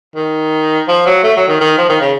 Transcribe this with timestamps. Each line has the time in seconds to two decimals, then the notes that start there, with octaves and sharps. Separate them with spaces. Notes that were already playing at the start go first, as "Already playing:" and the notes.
0.16 D#3
0.88 F3
1.06 F#3
1.24 A3
1.36 F#3
1.48 D#3
1.61 D#3
1.78 F3
1.89 D#3
2.01 C#3